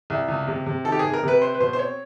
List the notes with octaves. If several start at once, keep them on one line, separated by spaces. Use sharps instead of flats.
C2
C#2
C3
C3
D#3 A4
G4
C3 G#4
A#4
C3 B4
C4 C5
B4
B2 C5
C5
C4 C#5